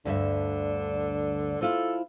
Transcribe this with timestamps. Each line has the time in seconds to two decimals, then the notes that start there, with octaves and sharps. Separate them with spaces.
0.05 D2 G2 D3 E5
1.61 E4 F4 A4 C5